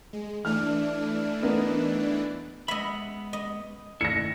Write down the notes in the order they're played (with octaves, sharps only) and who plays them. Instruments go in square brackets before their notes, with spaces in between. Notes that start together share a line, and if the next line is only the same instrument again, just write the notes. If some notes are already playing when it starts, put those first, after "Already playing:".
[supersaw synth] G#3
[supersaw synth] E3 A3 D4 [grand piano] F6
[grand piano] B3 D#4 A#4
[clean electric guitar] G#3 B3 B5 [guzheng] D#5 E5
[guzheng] D#5
[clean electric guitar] D#3 A3 E4 [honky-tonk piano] A#6 C#7